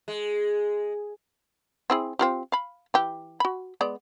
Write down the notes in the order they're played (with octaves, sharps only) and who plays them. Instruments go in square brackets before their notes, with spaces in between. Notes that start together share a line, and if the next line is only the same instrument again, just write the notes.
[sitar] G#3
[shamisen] C4 E4 G#4
C4 F4 G4
F5 B5
E3 G4
F#4 B5
G#3 B3 D5